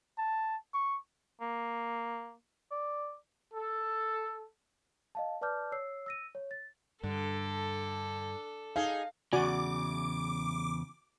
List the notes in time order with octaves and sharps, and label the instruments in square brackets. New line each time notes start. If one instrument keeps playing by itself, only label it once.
[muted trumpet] A5
C#6
[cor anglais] A#3
D5
[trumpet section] A4
[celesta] D#5 F5 A5
B4 D5 A5 D6 F6 G6
C#5 E6 C7
E6 A#6 D#7
C#5
A6
[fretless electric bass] G2 [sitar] D3 [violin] A4
[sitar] D#4 G#4 [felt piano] F5
[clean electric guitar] E2 C#3 [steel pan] F#4 D5 G#5 [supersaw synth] D6